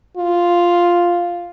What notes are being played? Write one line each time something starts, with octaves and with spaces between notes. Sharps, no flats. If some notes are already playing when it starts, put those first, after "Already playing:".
F4